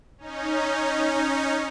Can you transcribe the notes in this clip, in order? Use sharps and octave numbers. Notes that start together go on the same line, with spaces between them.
C#4 D#4